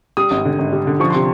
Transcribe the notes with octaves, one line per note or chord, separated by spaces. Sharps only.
G3 D#6
G#1
D3
G#1
G3
D3
F3 C#6
C3 C6